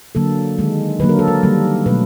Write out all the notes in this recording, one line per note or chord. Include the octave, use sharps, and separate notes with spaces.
D3 F#3 A#3 A4
D#3 G#3
D3 F#3 A#3 B4
A#4
A4
A#4
D#3 G3 A#3
B2 F#3 A3 B4